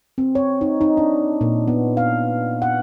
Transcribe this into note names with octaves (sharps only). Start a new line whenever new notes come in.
C4
C#5
D#4
D#4
D4
A#2
B3
F5
F#5